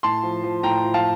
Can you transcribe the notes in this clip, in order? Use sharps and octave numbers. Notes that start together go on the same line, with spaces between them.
A2 A5 C6
F3
F3
A2 G5 A#5
F3
F5 A5